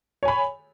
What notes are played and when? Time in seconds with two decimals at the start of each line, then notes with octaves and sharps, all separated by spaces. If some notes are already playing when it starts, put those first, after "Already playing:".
0.23 C#5
0.25 G#5
0.28 B5